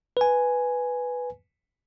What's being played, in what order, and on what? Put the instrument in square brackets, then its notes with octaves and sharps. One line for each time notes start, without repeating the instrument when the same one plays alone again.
[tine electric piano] B4 G#5